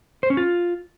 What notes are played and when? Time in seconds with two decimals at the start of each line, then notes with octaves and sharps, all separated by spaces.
0.23 C5
0.30 C#4
0.37 F4